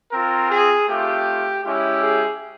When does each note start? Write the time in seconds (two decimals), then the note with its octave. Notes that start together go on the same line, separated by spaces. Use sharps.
0.12 C4 F4 A#4
0.50 G#4
0.88 A3 C4 F4 G4
1.64 G#3 C#4 E4 G4
2.01 G#4